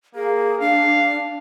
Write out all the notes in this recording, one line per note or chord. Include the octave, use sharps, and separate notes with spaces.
A#3 G#4
D4 F5